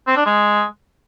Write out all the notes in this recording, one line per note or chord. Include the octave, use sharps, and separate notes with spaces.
C4
D4
G#3